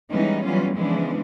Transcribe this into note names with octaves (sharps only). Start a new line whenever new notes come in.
E3 G3 G#3 B3 C#4 D#4
E3 F#3 G3 B3 C#4 F4
C#3 E3 F3 G#3 B3 D4